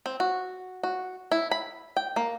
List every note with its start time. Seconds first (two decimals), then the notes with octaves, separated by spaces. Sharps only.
0.06 C4
0.20 F#4
0.83 F#4
1.32 E4
1.51 B5
1.97 G5
2.16 A#3